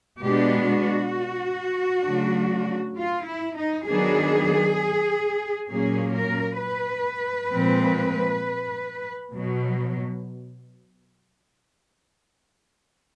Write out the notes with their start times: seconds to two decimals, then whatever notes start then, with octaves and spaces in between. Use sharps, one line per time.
0.22 B2 G#3 B3 D4 G4
0.68 F#4
2.04 C#3 F#3 A3 D4
2.97 F4
3.26 E4
3.57 D#4
3.87 D#3 F#3 B3 D4 G#4
5.70 A#2 F#3 A#3 C#4 G#4
6.15 A#4
6.62 B4
7.52 A#2 F3 G#3 C4
9.34 B2 F#3